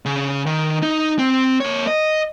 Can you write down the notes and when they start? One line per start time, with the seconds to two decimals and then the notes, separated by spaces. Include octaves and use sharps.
0.06 C#3
0.46 D#3
0.82 D#4
1.19 C4
1.60 A#3 C#5
1.87 D#5